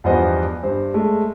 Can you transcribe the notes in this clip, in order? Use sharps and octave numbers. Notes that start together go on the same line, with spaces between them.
E2 G2 F3 B3 C5 D#5
G2 C5
G#3 A3